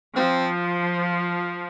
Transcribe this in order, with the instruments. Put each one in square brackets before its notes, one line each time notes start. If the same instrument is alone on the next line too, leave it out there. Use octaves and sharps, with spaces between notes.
[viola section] F3 [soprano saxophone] C4